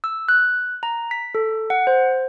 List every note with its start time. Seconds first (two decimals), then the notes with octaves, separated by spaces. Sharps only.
0.04 E6
0.29 F#6
0.83 A#5
1.11 B6
1.35 A4
1.70 F#5
1.87 C5